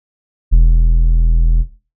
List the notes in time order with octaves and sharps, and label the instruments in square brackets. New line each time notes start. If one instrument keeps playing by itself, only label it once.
[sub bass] E1